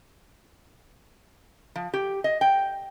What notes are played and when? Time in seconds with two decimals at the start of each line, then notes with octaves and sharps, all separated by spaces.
1.76 F3
1.94 G4
2.24 D#5
2.41 G5